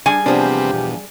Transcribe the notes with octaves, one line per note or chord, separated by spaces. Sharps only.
G3 D4 G#4 G#5
E2 C3 F3 B3 C4 D4 G4
B2